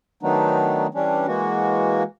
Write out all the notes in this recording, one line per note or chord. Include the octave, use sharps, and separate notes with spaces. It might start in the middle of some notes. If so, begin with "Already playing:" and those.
D#3 F#3 A3 B3 D4 D#4
E3 G3 C#4 D4
E3 G#3 A#3 F#4